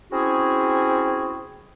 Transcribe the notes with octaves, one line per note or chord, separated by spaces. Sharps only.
C4 C#4 E4 F#4 G#4